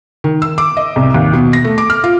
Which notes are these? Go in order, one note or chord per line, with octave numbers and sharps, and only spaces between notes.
D#3
E6
D6
D#5
C2
D#2
B2
A#6
A3
D6
F6
F4